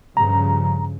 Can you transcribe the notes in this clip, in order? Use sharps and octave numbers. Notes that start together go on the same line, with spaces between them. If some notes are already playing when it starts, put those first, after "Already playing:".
G2 C#3 F3 A#5